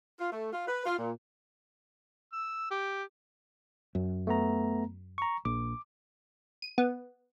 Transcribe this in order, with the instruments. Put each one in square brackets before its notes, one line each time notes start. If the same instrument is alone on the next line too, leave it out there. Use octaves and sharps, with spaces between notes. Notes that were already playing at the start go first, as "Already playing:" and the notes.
[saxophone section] F4
A3
F4
B4
F4
A#2
[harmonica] E6
G4
[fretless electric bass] F#2
[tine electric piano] A3 B3 A#5
A#5 C#6
[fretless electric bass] A#1 [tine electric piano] D6
[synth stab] D#7
B3